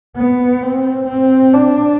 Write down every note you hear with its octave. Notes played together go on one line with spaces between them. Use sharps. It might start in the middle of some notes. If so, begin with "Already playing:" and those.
B3
C4
C4
D4